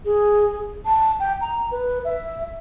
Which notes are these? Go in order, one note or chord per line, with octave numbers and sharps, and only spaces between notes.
G#4
A5
G5
A#5
B4
E5